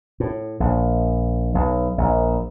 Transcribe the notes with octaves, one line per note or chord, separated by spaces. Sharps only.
A2
A#1
B1
A#1